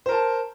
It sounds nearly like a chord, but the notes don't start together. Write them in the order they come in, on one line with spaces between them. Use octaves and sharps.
C5 A#4 A5